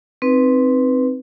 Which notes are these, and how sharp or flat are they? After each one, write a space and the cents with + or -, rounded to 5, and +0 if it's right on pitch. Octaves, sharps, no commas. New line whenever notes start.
C4 +0 D#4 +0 B4 +0